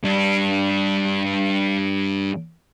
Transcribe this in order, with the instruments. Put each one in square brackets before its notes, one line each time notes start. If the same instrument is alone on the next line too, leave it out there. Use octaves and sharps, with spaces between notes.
[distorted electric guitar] G2 D4